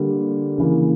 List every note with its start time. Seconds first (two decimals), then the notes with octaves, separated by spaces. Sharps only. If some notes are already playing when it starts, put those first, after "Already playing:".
Already playing: D3 G3 A#3
0.58 C#3 E3 A#3